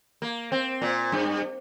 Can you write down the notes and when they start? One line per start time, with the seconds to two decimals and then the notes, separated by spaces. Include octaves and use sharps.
0.22 A#3
0.52 C4
0.82 A#2
1.12 G2